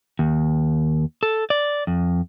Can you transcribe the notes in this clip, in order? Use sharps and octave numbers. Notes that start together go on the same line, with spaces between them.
D#2
A4
D5
F2